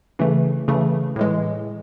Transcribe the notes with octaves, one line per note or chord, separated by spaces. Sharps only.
C#3 E3 A3
C#3 E3 A3
A2 E3 G#3